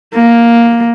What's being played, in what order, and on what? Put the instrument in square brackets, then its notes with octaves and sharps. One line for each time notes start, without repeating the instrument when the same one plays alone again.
[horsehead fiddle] A#3